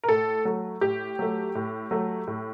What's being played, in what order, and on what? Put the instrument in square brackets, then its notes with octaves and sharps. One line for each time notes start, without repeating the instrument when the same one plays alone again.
[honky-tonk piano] A#4
A2 A4
F#3 A3
A2 G4
F#3 A3
A2
F#3 A3
A2